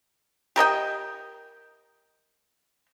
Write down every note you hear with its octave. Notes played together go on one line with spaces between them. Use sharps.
G4 A#4 D#5 G5